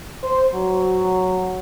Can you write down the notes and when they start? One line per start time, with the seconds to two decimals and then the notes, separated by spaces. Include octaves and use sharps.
0.23 C5
0.54 F#3